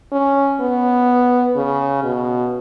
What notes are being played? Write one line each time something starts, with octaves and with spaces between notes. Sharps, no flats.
C#4
B3
C#3
B2